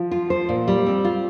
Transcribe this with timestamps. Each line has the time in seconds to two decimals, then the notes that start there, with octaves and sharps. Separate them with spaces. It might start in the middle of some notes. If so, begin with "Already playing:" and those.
Already playing: F3
0.11 F4
0.30 C5
0.49 A#2
0.68 G3
0.86 C4
1.04 F4